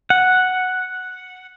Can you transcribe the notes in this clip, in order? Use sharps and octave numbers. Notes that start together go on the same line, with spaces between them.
F#5